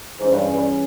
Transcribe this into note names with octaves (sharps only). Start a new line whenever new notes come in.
G#2 E3 G3 C#4 G#4
G2
G2